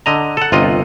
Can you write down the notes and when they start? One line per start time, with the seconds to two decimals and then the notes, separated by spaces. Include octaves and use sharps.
0.06 D3 D#5 A#5
0.37 A4 F#5
0.52 G1 C3 F4 D#5